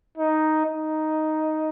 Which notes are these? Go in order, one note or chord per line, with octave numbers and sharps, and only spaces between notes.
D#4
D#4